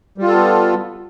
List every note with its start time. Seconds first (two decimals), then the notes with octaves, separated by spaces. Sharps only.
0.18 G3
0.23 F4
0.28 A4
0.32 B3